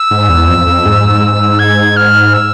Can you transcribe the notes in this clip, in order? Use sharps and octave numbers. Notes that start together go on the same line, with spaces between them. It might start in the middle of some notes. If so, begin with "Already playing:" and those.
Already playing: E6
G#2
E2
F2
F2
G#2
G#6
F6
E6